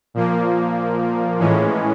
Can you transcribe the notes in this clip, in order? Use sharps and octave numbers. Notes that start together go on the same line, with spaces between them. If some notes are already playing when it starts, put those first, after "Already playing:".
A#2 F3 A#3
A2 E3 G#3 C#4